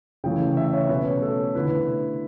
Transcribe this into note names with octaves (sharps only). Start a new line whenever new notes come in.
C#3 E3 A3 G5
E5
C#5
B2 A3 C#4 B4
A4
D3 A3 E4 B4